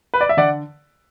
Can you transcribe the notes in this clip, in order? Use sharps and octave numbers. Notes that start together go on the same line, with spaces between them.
B4
D5
E5
D3 D5 F#5